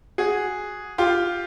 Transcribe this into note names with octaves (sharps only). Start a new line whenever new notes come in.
F#4 G#4
F4 G4